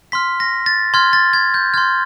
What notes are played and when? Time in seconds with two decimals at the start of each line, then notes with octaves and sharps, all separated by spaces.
0.12 C6 F6 B6
0.40 A#6
0.66 A6
0.94 C6 F6 G#6
1.13 A6
1.33 G#6
1.54 G6
1.74 C6 F6 G#6